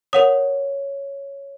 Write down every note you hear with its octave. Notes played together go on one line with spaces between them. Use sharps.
A#4 C#5 F#5 D#6